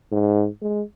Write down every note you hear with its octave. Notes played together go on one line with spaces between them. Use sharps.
G#2
G#3